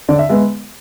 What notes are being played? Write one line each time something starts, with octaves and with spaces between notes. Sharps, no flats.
D3 D5
E5
G#3 B3 E5